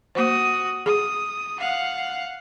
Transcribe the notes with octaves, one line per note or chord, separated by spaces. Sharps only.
A#3 F#4 C5 D#6
G#4 D#6
F5 F#5